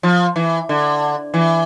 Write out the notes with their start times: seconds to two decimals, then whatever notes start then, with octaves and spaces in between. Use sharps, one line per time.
0.03 F3
0.36 E3
0.69 D3
1.34 E3